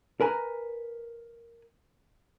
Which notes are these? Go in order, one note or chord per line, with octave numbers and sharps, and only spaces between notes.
A#4 B4 G#5 A#5